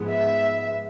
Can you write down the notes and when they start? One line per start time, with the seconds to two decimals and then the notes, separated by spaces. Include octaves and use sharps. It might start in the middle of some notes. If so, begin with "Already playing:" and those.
Already playing: G#2 F3 G#3 B3
0.10 E5